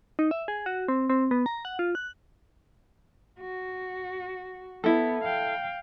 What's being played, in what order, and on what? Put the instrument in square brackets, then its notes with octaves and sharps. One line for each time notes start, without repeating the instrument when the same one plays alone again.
[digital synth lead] D#4
E5
G#4
F#4
C4
C4
B3
A#5
F#5
F4
F#6
[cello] F#4
[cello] B3 [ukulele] E4 A4
[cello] F5 G5